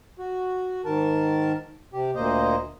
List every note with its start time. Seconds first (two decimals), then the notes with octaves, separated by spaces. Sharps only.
0.19 F#4
0.85 G#2 D#3 A#4 A5
1.93 C3 G4
2.15 D2 A#2 A#3 C5 D#5